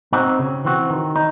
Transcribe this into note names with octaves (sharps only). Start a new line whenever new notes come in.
C4 D#4 F#4
C#3
E3 C4 F#4
D#3
D#4